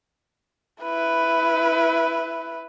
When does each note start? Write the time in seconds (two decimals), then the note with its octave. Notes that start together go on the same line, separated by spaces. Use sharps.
0.82 E4 B4